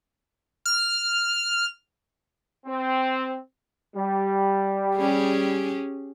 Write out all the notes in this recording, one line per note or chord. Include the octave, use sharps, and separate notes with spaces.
F6
C4
G3
C#4 G4 G#4